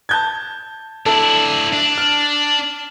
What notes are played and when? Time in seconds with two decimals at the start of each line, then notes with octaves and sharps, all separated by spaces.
0.09 A5 G6 G#6
1.06 D4 E4 A4
1.73 D4
1.98 F6